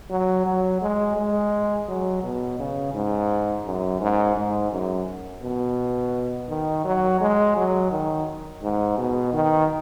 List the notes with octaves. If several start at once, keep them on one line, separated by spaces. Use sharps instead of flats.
F#3
F#3
G#3
G#3
F#3
B2
C#3
G#2
F#2
G#2
G#2
F#2
B2
D#3
F#3
G#3
F#3
D#3
G#2
B2
D#3